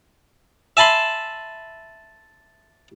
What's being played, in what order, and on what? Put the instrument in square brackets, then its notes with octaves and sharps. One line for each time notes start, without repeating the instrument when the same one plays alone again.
[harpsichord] E5 G#5 A5 B5 C6